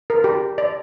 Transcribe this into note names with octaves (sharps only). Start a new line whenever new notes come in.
A#4
G4
D5